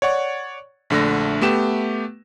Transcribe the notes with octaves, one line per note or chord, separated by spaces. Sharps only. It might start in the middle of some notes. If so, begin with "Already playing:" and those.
C#5 D5 F#5 C#6
A#1 D3 A3 A#6
A3 B3 G4 E7